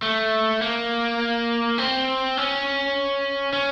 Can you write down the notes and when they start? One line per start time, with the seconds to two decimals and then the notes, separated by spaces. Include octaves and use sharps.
0.02 A3
0.62 A#3
1.78 C4
2.37 C#4
3.53 C#4